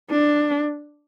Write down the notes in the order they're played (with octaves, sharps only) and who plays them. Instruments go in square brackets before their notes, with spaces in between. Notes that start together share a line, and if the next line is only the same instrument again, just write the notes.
[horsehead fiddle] D4